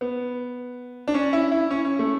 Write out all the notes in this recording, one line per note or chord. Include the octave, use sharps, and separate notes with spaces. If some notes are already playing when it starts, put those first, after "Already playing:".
B3
D4
C#4
E4
E4
C#4
C#4
A3